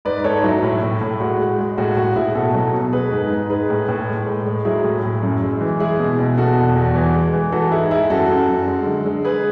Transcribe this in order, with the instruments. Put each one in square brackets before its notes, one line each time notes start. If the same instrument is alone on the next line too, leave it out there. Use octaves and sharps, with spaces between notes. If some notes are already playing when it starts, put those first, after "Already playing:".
[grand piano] G#2 B4 D5
G#2 A4 C#5
F#3 E4
A2 E4
A2
A2
G#3 F#4
G#3
G#3
A2 F#4
A2 F#4
A2 E4 G#4
B2 F#4 A4
F#3
B2
G#3 G#4 B4
G#2
G#2
G#3 G#4 B4
A2
A2
G#3
A2
G#3
F#3 E4 G#4
A2
A2
F#2
G#3
E3
G#3 E4 G#4
B2
B2
B2 F#4 A4
E2
E2
E3
G#3
E3
E3 F#4 A4
G#2 E4 G#4
G#3 E4 G#4
F#2 F#4 A4
F#2
F#2
G#3
D3
G#3
G#3 G#4 B4